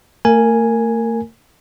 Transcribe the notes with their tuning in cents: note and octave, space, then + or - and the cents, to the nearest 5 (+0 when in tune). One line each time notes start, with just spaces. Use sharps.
A3 +40 A#4 -15 G#5 +0